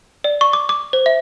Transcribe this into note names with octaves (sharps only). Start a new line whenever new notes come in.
D5
C#6
D6
D6
C5
E5